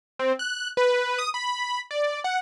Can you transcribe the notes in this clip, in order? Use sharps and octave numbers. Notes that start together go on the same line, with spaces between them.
C4
F#6
B4
D#6
B5
D5
F#5